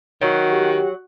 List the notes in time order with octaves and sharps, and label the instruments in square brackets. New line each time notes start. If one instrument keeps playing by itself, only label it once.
[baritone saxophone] D#3 [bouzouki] F#3 [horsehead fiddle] F#4 F#5
[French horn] G4